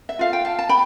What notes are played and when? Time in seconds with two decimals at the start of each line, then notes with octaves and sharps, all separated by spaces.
0.09 E5
0.19 F4 A4 F5
0.33 G5
0.45 F5 A5
0.59 A5
0.69 G5 B5